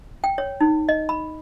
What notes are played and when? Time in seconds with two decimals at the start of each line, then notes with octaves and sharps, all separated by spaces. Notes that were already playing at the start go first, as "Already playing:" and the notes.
0.24 G5
0.38 C#5
0.60 D#4
0.89 D#5
1.09 B5